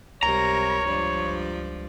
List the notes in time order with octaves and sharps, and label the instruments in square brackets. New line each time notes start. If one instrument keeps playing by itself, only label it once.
[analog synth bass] C#2 [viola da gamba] C3 G3 A#4 [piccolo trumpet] C#5 [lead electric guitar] A#5
[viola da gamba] G2 F3 D5